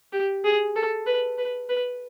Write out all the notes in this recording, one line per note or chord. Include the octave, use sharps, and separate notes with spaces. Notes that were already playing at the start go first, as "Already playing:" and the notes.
G4
G#4
A4
B4
B4
B4